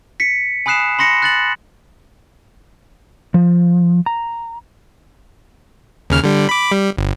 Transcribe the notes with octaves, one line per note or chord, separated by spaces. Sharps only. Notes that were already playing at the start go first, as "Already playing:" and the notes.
B6 C#7
G#5 B5 D#6 F#6 C7 E7
B5 C6 A#6 C#7
F#6 A6 F#7
F3
A#5
D#2 C#3 F6
D3 G3
B5 D6
G3
G1